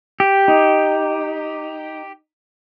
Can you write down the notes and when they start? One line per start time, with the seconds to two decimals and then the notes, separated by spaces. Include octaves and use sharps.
0.20 G4
0.48 D#4